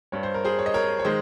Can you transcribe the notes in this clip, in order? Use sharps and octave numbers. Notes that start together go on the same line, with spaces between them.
G2 G3 C#5
C5
A#4
G#4 C5
C#5
D#5
A#4 C#5
C#5
D#3 G#3 G#4 C5